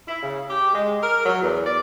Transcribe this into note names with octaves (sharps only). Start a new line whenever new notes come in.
E4
C#3
G4
G#3
A#4
F#3
E2
D5